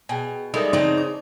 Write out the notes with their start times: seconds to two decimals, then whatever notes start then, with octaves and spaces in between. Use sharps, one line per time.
0.09 B2 G#4 G5 G#5
0.54 G3 G#3 D#4 E4 A4 A#4
0.73 C#3 C4 D#4 D5 A5
0.97 D6